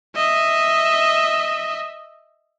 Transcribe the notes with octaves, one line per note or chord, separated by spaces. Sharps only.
D#5 E5